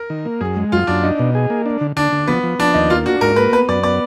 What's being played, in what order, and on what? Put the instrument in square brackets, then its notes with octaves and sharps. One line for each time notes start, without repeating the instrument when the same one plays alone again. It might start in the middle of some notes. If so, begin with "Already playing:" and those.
Already playing: [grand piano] A#4
[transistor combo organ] D#3
A#3
[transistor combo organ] F#2 [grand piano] G#4
[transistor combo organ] G#3
[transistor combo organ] F#2 [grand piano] F4
[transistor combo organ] F#2 [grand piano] D4
[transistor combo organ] D4 [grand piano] D#4
[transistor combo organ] B2
G#4
A#3
D4
D3
[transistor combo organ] D3 [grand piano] D4
[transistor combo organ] D3
[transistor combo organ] F3 [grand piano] B3
[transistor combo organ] F3
[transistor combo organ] F3 [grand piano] D4
[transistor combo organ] D#2 [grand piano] D#4
[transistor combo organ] A#3 [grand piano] F4
[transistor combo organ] D4 [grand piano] F#4
[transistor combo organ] G#2 [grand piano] A#4
[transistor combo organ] A#3 [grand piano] B4
[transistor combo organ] B3 [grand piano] B4
[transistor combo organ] F#2 [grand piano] D5
[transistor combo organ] B3 [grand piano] D5